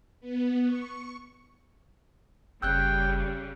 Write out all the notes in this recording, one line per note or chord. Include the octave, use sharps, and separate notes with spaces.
B3
C#6
F#1 C#3 G3 G5 E6 F#6 G6